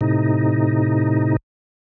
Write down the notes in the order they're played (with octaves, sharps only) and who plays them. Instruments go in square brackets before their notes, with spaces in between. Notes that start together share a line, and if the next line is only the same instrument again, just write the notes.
[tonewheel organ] A2 C3 D#4